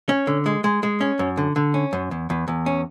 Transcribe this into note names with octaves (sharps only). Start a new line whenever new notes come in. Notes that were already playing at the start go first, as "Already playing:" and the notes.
C#4
D3
G#3
G#3
G#3
C#4
F#2
D3
D3
C#4
F#2
E2
E2
E2
C#4